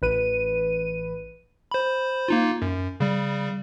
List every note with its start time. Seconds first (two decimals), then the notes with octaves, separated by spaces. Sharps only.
0.02 A1 B4 D#7
1.71 C5 B5
2.28 A#3 D#4 F4
2.62 F#2
3.00 C#3 G3